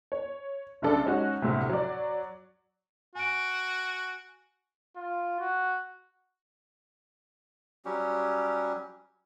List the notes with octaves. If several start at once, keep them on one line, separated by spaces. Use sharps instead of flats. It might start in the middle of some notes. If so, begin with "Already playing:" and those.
C#5
F#1 B1 C#3 D4 A4 D5
G#3 C#4 D#4 F#4
D2 A2 C3
F#3 D5
F#4 G#5 D7
F4
F#4
F#3 G3 C#4 G4